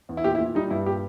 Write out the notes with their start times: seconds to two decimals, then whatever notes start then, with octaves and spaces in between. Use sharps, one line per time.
0.09 E2
0.17 E4
0.24 A#2 G4
0.35 E4
0.40 A#2
0.46 E4
0.55 G3 D#4
0.70 G2 E4
0.86 A#2 G4